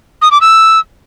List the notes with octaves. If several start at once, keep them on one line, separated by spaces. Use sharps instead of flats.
D#6
D6
E6